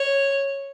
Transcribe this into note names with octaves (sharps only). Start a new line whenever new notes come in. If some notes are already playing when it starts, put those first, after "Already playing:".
Already playing: C#5